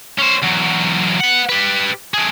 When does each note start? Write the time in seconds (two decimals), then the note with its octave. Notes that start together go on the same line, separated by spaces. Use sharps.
0.19 C#4 C5
0.43 E2 F#3
1.20 B4 F#5
1.49 G4 B4
2.14 A3 G#4